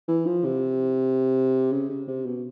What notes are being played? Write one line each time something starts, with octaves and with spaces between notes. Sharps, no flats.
E3
F3
C3
C#3
C#3
C3
B2